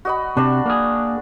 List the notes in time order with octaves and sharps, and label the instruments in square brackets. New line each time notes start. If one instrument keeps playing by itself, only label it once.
[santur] F#4 D#5 B5
[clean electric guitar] C3 [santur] D4 D5
[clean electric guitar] A#3 G#4